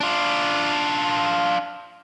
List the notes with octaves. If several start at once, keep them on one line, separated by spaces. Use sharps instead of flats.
D4 F4